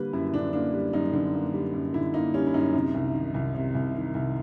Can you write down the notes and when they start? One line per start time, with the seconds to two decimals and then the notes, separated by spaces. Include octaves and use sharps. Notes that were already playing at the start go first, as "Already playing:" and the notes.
Already playing: D3 G3 A#3 B4
0.13 F#2 E4
0.33 D3 D4
0.53 A#3 D4
0.73 G3
0.93 F#2 D#4
1.13 D3
1.34 A#3
1.54 G3
1.74 F#2
1.94 D3 E4
2.14 A#3 D#4
2.34 G3 C#4
2.47 E4
2.54 F#2 D#4
2.74 C3
2.94 C2
3.14 D#3
3.34 C2
3.55 C3
3.75 C2
3.95 D#3
4.14 C2